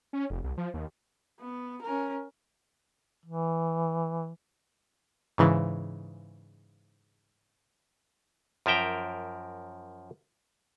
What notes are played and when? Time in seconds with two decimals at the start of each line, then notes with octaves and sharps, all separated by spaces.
0.13 C#4
0.30 F1
0.44 C2
0.57 F3
0.74 D#2
1.40 B3
1.82 C#4 A#4
3.25 E3
5.38 G#2 C#3 E3
8.66 F#2 F3 A#4 E5 G5 A#5